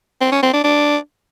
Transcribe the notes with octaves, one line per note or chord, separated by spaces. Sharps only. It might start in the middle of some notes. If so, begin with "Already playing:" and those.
C4
C#4
C4
D4
D4